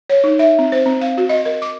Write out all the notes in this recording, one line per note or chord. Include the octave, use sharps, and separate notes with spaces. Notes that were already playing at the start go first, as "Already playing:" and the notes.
C#5
D#4
E5
C4
C5
C4
F5
F#4
D#5
A#4
D6